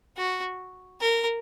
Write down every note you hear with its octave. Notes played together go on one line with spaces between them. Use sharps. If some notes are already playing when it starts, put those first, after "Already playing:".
F#4
A#4